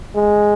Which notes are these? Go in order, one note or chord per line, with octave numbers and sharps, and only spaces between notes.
G#3